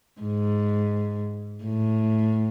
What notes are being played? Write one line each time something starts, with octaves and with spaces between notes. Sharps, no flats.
G#2
A2